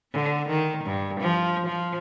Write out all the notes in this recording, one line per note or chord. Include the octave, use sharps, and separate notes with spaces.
D3
D#3
G2
F3
F3